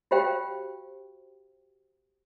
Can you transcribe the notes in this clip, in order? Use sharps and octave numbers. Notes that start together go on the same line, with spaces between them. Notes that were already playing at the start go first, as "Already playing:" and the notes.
F#4 G4 C5 F5 G5